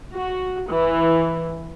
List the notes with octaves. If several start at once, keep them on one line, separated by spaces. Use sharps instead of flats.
F#4
E3